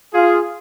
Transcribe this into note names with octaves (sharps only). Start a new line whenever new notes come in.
F4 G#4